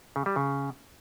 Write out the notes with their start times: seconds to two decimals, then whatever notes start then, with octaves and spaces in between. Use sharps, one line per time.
0.16 C#3
0.26 G3
0.36 C#3